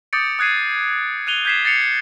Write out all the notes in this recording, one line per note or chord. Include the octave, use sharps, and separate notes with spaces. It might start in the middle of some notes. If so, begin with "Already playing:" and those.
D6 D#6 G6 A6 C#7 D7
D#6 F#6 G#6 C7 D#7
F#6 D#7 F7 G7
G6 G#6 B6 C7 E7
A6 C7 C#7 F7